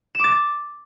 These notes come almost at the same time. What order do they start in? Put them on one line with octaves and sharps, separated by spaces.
E7 D6 A6